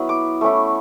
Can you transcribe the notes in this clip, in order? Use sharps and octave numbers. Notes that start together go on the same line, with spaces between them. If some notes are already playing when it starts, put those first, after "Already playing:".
Already playing: F#3 B3 E4
D6
A3 C#4 E4